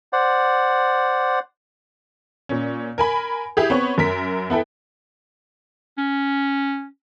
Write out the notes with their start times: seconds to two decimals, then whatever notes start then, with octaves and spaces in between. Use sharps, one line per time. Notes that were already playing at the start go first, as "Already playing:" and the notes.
0.13 C5 D5 F#5
2.49 A#2 C#4
2.98 A#4 G#5 B5
3.57 E4 G4 G#4
3.70 B3 C4 C#5 C#6
3.98 F#2 A#4 B6
4.50 B3 E4 A4 G5
5.98 C#4